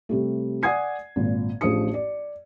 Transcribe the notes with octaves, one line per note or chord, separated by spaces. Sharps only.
C3 G3 A3
D5 F#5 G#5 D#6 G#6 C7
G#1 A#2
A1 F3 D4 G#4 D#6 C#7
D5